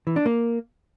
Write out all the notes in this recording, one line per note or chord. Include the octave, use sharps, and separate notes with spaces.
E3
D4
A#3